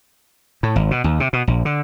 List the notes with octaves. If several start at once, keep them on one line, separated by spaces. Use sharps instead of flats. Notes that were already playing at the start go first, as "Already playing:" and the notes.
A2
G#1
B2
D#2
C3
B2
A#1
D3